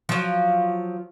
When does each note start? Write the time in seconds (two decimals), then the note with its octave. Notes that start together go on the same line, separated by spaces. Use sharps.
0.09 F3 F#3